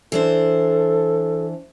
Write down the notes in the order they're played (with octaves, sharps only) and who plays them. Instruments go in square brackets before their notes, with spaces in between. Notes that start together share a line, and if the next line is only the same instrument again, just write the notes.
[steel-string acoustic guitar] E3 D4 C5 [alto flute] A4